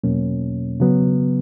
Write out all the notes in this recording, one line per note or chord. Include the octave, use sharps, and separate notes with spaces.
E2 B2 F#3 A#3 C#4
C#3 F#3 B3